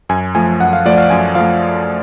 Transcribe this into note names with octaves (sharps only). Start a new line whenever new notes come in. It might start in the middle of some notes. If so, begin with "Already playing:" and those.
F#2 G#5
F3 A3 G#5
F#2 F#5
F5
F3 A3 D5
F5
F#2 G#5
F3 A3 F5